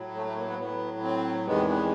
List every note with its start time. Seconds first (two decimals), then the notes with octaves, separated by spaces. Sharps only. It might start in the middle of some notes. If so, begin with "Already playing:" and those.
Already playing: A2 F#3
0.15 A3
0.26 A3
0.37 A#3
0.48 B3
0.59 A2 F#3 B3
1.02 C4
1.46 E2 C3 D#3 G#3 B3
1.68 B3